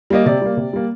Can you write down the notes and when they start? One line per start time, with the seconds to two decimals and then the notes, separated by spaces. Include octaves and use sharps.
0.10 G3 A#3 D#5
0.26 C3 D5
0.41 G3 A#3
0.57 C3
0.73 G3 A#3